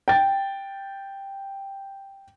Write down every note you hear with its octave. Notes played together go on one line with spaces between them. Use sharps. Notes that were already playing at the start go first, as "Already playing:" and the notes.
G5 A6